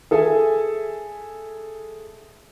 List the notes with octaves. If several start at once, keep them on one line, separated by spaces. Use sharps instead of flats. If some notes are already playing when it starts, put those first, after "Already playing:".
G#4 A4 E5 G#5